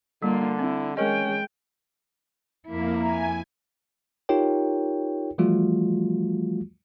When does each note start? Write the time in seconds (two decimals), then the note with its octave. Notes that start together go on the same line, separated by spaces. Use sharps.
0.22 D3 G3 A#3 F4
0.59 C4 E4
0.97 G#3 C#4 A#4 D#5 G5
2.67 F2 A#3 E4 E5
3.01 E5 G#5 A#5
4.29 D#4 F4 G4 A#4 C#5 G5
5.38 E3 F3 G3 A3 F4 F#4